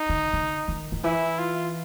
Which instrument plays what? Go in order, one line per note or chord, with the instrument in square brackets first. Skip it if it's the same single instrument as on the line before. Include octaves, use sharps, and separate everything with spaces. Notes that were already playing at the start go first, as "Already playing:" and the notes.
Already playing: [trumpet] D#4
[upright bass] D3
D3
D#3
D#3
[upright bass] E3 [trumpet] E4
[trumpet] F4